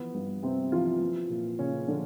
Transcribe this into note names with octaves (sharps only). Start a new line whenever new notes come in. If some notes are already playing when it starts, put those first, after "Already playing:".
Already playing: E3 F3 B3
G2
G2 C3 C4
E3 F3 F4
F3
A#2
A#2 C#3 C#4
D3 F3 D4